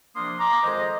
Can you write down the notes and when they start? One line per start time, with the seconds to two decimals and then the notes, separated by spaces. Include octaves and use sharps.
0.15 C3 F3 A#3 D4 C6 D#6
0.39 A#5 D6
0.63 F2 D#3 G#3 C5 D#5